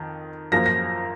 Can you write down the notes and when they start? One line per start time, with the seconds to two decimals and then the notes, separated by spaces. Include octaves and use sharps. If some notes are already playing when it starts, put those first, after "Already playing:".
Already playing: F2 D#3
0.52 F#2 F3 A#3 A#6
0.66 A#6